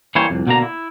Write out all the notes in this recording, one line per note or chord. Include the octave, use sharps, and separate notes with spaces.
E3 G3 A#3 C5 C#5
C2 F2
B2 D3 A#3 A#5
E4